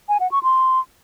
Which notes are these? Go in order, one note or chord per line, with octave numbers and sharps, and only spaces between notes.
G#5
F#5
C#6
C6